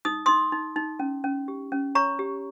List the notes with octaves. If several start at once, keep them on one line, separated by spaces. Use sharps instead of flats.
D#4 D#6
D#4 C6 D#6
D#4
D#4
C#4
C#4
G4
C#4
C#5 A#5 C#6
G4